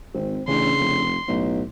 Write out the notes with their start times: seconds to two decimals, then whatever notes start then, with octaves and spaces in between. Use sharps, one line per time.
0.14 G#1 C4
0.48 A1 C#3 D4 C6
0.79 F1
1.28 B1 A2